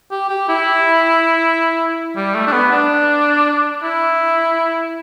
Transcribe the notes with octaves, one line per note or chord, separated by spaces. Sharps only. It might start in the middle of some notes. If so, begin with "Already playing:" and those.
G4
G4
E4
G3
A3
D4
B3
D4
E4